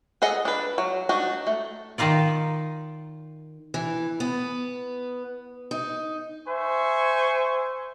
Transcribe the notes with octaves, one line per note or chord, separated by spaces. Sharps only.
G#4 A4 D#5 F#5
D4 B4
F#3
D4 D#4 F#4
A3
D#3 D#4 F4 D5
E3
B3
D#4
C5 E5 G#5 C#6